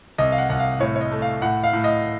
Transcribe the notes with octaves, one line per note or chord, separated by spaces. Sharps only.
C2 D#5
F5
F#5
C2 F#5
F5
A2 C#5
C#5
D#5
A3
F5
A2 F#5
F5
A2
D#5